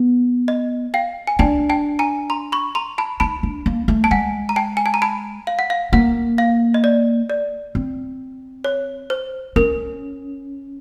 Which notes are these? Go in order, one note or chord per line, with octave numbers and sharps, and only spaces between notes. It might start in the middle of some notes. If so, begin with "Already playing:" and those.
Already playing: B3
D#5
F5 G5
G#5
D4 G5 A5
G5 A5
G#5 A#5
A#5 C6
B5 C#6
A#5 C6
A5 B5
D#4 A5 B5
D4
A#3
A3
A5
G#3 F#5 G#5
A#5
G5 A5
G#5
A5
A#5
A5 B5
F5
F#5
F5
A#3 F#5
F5
D#5
D5
D5
C4
C#5
C5
C#4 A#4